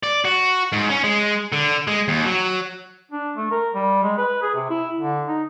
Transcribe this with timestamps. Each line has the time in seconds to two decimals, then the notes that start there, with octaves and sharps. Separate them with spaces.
0.03 D5
0.25 F#4
0.72 G#2
0.90 C#4
1.04 G#3
1.52 D3
1.88 G#3
2.08 D#2
2.25 F#3
3.11 D4
3.37 A3
3.51 A#4
3.75 G3
4.03 G#3
4.18 B4
4.42 G#4
4.55 C3
4.70 E4
4.99 D3
5.28 D#4